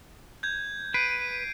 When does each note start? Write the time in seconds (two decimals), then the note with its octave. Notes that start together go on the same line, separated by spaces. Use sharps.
0.43 G6 G#6
0.94 B4 C7 D7 D#7